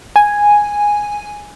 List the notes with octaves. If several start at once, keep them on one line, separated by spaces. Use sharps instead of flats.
G#5